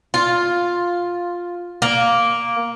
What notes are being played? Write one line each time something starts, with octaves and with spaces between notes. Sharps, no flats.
F4
A#3